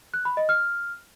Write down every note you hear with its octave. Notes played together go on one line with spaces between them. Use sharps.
F#6
B5
D#5
F6